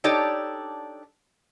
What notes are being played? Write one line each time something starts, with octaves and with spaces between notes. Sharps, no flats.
D4 D#4 G4 A4 C#5 D5